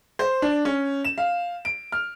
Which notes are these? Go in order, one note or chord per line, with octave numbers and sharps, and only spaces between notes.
C5
D4
C#4
E7
F5
D7
F6